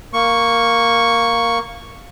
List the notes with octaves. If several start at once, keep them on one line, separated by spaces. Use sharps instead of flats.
A#3 C#6